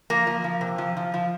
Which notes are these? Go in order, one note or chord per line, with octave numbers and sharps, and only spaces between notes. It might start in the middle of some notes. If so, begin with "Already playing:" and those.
F3 A#3
F3
F3
C3
F3
F3
F3